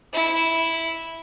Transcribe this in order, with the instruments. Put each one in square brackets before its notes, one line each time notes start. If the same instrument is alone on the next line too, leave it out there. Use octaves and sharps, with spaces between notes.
[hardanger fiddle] E4